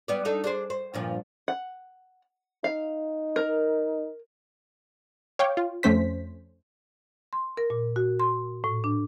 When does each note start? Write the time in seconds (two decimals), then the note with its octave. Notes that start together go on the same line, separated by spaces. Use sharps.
0.08 G3 B3 D5
0.25 D4 D#4 A4
0.44 D4 G#4 C5
0.70 C5
0.94 G2 A#2 F3
1.48 F#5
2.64 D#4 F5
3.36 A#4
5.39 C#5 F5 G5 D6
5.57 F4
5.83 F2 A3 C#4 C5 B6
7.33 C6
7.57 A#4
7.70 A#2
7.96 F#4
8.20 C6
8.64 A2
8.84 D4